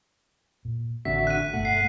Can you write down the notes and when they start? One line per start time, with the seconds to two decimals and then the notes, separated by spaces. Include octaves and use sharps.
0.65 A#2
1.05 A1 D3 C4 F#4 E5 B6
1.27 F#6 D#7
1.53 G1 B2 A3 F#5
1.65 C7